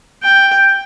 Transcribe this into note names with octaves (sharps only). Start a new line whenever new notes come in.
G5